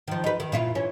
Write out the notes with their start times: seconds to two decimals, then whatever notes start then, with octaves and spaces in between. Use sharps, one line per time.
0.08 D#3 F3
0.24 D#4 B4
0.40 D#3
0.52 A#2 E4 F4
0.75 E3 C#4